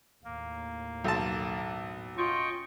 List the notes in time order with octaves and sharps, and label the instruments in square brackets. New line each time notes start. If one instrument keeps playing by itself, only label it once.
[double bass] D#2 A2 [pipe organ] A#3
[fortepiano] B1 A5
[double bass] C#4 [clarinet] F4 [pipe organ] D#5 G5 C#6